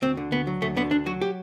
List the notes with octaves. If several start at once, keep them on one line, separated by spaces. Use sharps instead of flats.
D2 C4
D3
D2 B3
F#3
D2 A3
D3 B3
D2 D4
F#3 F#4
G4